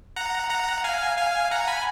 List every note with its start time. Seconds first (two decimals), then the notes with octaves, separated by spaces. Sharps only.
0.16 F#5 A#5
0.50 F#5 A#5
0.84 F5 G#5
1.17 F5 G#5
1.51 F#5 A#5
1.68 G#5 B5